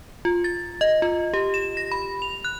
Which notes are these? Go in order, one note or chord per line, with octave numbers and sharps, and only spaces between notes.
F4
A6
D#5
F4
G4
E7
A#6
B5
F7
F#6